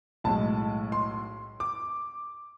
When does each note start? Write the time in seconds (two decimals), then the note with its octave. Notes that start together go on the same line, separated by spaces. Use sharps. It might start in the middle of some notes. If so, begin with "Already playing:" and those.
0.24 B1 A2 G#3 A5
0.92 C6
1.60 D6